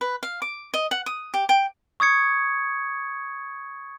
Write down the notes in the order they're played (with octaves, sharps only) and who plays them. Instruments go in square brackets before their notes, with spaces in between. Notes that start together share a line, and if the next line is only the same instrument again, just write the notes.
[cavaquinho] B4
F5
D6
D#5
F#5
D#6
G4
G5
[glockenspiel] C#6 D#6 G#6 C#7